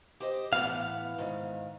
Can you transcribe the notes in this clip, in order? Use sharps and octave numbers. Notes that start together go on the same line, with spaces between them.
G4 C5 D#5
A2 E3 B3 F5
G#2 D#3